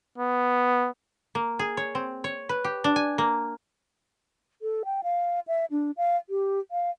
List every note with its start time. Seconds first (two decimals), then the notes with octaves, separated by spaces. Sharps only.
0.18 B3
1.35 A#3
1.59 G#4
1.77 C#5
1.95 C4
2.24 C#5
2.49 B4
2.64 G4
2.84 D4
2.96 G#5
3.18 A#3
4.62 A4
4.85 G5
5.03 F5
5.47 E5
5.71 D4
5.97 F5
6.29 G4
6.71 F5